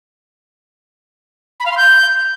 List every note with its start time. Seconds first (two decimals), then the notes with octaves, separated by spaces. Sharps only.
1.60 B5
1.66 F5
1.72 C6
1.77 G6